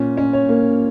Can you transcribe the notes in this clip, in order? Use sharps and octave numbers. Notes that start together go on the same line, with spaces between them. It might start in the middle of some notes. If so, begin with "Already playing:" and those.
Already playing: A#2 C#4
C#4
C#5
A#3